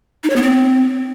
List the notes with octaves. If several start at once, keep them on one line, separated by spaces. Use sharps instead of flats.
D#4
C#5
B3
C4